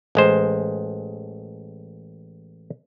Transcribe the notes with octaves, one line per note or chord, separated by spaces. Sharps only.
A1 G#3 C5